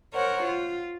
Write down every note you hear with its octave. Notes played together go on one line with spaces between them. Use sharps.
A#4 C5 C#5 F#5
F4